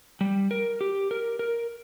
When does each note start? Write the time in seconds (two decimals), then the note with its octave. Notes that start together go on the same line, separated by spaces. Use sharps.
0.21 G3
0.51 A#4
0.81 G4
1.11 A#4
1.39 A#4